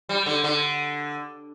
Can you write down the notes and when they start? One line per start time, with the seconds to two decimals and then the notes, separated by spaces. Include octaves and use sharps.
0.09 G3
0.26 D3
0.44 D3